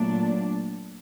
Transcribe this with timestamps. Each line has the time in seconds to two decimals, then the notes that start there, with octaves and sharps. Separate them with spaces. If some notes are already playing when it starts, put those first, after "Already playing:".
Already playing: A#2 F#3 A3 D4